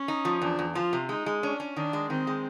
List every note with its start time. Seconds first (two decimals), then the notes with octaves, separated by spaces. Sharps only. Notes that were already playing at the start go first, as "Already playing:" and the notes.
Already playing: C#4
0.08 D#4
0.25 F3
0.42 E2 D4
0.59 E2
0.75 F3 F4
0.93 C3
1.09 G#3 D#4
1.26 G#3
1.42 C#4 D4
1.60 C#4
1.76 D#3 D4
1.93 G#3
2.10 D#3 C4
2.27 G#3